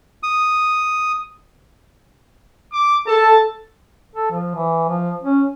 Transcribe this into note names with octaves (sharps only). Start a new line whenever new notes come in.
D#6
D6
A4 A5
A4
F3
E3
F3
C#4